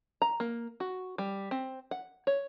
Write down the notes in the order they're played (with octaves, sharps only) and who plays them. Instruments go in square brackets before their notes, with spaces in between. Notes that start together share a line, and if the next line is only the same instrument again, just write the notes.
[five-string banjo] A#5
A#3
F#4
G3
C4
F#5
C#5